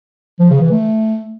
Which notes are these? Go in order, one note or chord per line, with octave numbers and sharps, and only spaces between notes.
F3
C#3
E3
A3